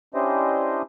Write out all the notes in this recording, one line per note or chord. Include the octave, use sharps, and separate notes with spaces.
C#4 D4 E4 G4 C5 D#5